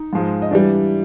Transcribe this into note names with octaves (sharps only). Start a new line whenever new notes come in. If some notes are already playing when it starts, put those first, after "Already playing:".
Already playing: D#4
G#2 F3 G#3
D#5
E3 G3 D4 D5